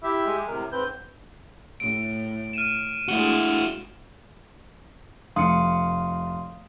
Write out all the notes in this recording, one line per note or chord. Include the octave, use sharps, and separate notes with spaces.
E4 G4 E5
G#3
A2 C3 A#4
G#2 C4 B4 G6
A2 D7
F6 D#7 E7
G#3 A3 D4 E4 F#4 E7 G7
F1 F5 C6 D#6 C#7